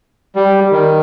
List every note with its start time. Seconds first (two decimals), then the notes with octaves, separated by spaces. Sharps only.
0.36 G3
0.71 D#3